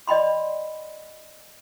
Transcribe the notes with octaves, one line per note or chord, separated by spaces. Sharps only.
D5 D#5 G5 B5 C6